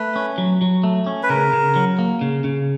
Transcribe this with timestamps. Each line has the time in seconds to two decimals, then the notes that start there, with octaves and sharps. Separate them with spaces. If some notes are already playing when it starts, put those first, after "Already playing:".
Already playing: A3 B4
0.16 C#4
0.38 F#3
0.61 F#3
0.83 A3
1.06 C#4
1.23 B4
1.29 C#3 A#4
1.53 C#3
1.76 F#3
1.99 A#3
2.21 C#3
2.44 C#3